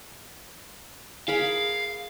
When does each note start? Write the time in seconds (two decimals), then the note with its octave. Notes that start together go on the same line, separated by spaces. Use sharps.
1.28 G#4 A#4 F5 B5